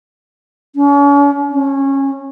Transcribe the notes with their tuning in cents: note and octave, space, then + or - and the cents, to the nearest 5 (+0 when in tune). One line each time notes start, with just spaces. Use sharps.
C#4 +40
C#4 -20